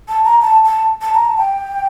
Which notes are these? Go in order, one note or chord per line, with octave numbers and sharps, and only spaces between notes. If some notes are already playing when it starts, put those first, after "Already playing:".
A5
A#5
A5
A5
A5
A#5
A5
G5